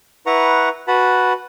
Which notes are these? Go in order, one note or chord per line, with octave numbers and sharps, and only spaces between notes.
E4 B4 F#5 A#5 C#6
F#4 B4 F#5 A5 B5